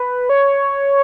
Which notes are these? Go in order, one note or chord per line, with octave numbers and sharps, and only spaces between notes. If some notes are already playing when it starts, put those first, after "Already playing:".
Already playing: B4
C#5